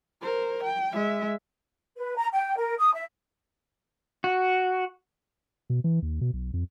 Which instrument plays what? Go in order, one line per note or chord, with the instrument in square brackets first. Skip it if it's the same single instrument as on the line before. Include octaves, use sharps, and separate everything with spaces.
[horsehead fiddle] A#4 C5
G5
G#3 E5
[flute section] B4
A#5
G5
A#4
D#6
E5
[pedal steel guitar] F#4
[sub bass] B2
E3
D#2
B2
B1
F2